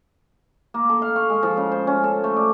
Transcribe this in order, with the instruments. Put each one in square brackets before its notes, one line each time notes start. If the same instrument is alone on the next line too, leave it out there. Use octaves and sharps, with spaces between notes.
[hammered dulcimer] A#3
A4
F5
C#6
G#3
F3
C#3
C5
C#4
A4
A3
D5